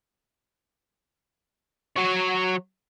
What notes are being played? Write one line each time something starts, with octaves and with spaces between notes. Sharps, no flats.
F#3 C#5